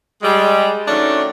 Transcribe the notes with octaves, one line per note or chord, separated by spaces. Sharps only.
G3 G#3
D#3 F#3 A3 C#4 D4